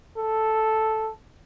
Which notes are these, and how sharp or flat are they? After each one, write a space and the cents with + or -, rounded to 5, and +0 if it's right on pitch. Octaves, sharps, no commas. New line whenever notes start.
A4 -5